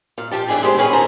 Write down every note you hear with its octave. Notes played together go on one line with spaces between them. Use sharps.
A#2 F5
F3 G4 A5
A2 E3 D4 E4 G#4
G#3 G4 C5
B3 C#4 E4 G#4 B4
D#3 G#4 A4 C5 A#5